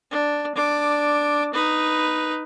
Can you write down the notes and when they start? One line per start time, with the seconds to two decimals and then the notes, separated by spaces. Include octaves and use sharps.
0.11 D4
0.55 D4 D6
1.54 D#4 B4